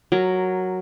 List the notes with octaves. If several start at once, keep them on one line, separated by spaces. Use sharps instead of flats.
F#3 A#4